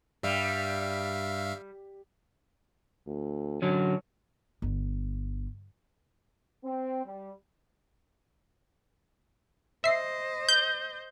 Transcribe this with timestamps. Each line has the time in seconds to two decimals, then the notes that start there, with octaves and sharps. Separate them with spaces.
0.23 G2 G3 E5 F5
3.07 D2
3.62 D3 F#3 C#4 F#4
4.62 G1
6.64 C4
7.05 G3
9.84 C5 D#5 E5 C7
10.49 G6